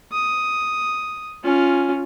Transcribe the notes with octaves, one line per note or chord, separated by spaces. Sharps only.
D#6
C#4 F4